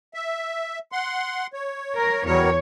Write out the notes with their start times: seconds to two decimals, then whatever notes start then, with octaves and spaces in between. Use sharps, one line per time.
0.14 E5
0.92 F#5 C6
1.53 C#5
1.95 A#4
2.25 E2 F#3 G3 A#4 C#5